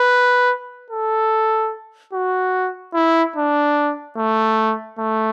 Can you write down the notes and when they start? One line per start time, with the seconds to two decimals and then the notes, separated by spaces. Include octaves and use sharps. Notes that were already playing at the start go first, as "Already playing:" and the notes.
Already playing: B4
0.90 A4
2.13 F#4
2.94 E4
3.36 D4
4.17 A3
4.99 A3